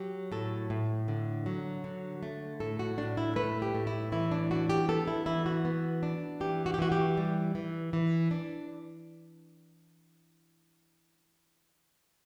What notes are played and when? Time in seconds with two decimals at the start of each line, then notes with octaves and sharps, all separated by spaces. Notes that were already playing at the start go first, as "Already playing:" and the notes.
Already playing: F#3 G4
0.32 A2 A4
0.70 A2
1.08 D3
1.46 F#3
1.84 D3
2.23 A3
2.60 A2 A4
2.79 F#4
2.98 A2 D4
3.17 E4
3.36 A3 B4
3.62 G4
3.75 A2
3.87 E4
4.12 E3 E4
4.31 D4
4.51 D4 F#4
4.69 G4
4.88 B3 A4
5.08 E4
5.26 E3 E4
5.46 F#4
5.65 B3
6.03 D4
6.40 E3 G4
6.66 F#4
6.74 G4
6.79 E3 F#4
6.92 G4
7.17 G3
7.55 E3
7.93 E3
8.31 D4